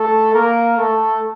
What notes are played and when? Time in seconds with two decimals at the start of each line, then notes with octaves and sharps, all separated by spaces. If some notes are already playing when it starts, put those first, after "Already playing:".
Already playing: A3 A4
0.34 A#3 A#4
0.78 A3 A4